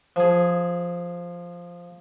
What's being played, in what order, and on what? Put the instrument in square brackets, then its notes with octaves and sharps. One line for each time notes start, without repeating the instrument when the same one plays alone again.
[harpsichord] F3 G#4